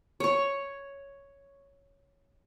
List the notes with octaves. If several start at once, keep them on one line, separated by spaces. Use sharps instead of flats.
C#5 C#6